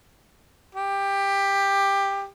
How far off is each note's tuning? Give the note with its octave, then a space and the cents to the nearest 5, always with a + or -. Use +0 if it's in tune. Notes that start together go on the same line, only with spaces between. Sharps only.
G4 +15